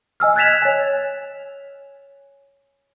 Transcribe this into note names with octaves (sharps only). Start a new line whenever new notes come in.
D#5 G#5 E6 F6
F#6 G#6 A6 B6 E7 F7
C#5 G#5